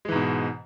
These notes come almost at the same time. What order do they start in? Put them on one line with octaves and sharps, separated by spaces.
G#3 E3 G#2 B2